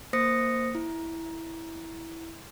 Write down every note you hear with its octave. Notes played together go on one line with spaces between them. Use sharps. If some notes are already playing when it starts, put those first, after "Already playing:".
A#3 C5 D#6 A#6 C#7
E4